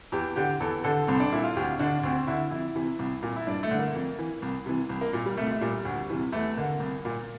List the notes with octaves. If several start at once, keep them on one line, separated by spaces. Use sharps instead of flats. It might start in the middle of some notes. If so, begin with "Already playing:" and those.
E2 G4
D3 G4
E2 A4
D3 A4
C2 C4
D4
A#2 E4
F4
D2 G4
D3 D4
D2 C4
D3 E4
F2 E4
C3 E3
C2
A#2
E4
G2 D4
A3
D3
A#3
F2
E3
C2
C3 E3
C2
A#3
A#2
G3
C2 A3
A3
A#2 G3
D2
C3 E3
E2 A3
D3 A#3
C2
A#2